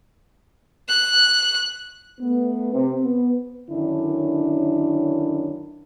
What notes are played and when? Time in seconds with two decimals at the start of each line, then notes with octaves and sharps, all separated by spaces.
0.88 F#6
2.21 A3 B3
2.73 C3
3.03 B3
3.71 F#2 D3 D#3 C#4 D4 E4